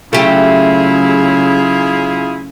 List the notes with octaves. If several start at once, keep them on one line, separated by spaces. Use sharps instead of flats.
C#3 F#3 A3 E4 F4 G4 G#4